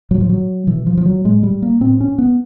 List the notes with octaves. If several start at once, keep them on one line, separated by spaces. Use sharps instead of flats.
A2 F#3
F3
F#3
B2 E3
F3
F3
F#3
A2 G#3
G3
A#3
A2 C4
C#4
B3